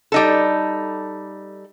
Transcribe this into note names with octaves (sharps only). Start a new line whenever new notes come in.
G3 D#4 A4